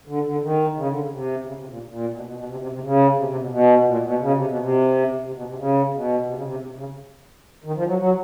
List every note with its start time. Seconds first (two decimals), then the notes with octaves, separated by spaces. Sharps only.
0.07 D3
0.25 D3
0.42 D#3
0.76 C#3
0.88 D3
0.99 C#3
1.11 C3
1.45 C#3
1.57 C3
1.68 A#2
1.88 A#2
2.13 B2
2.25 B2
2.36 B2
2.48 C3
2.60 C3
2.71 C3
2.83 C#3
3.13 C#3
3.17 C3
3.28 C3
3.40 B2
3.51 B2
3.85 A#2
4.03 B2
4.20 C#3
4.32 C3
4.45 B2
4.57 C3
5.23 C3
5.35 B2
5.47 C3
5.58 C#3
5.92 B2
6.26 C3
6.35 C#3
6.42 C3
6.61 C3
6.78 C#3
7.64 D#3
7.76 F3
7.86 F#3
7.98 F#3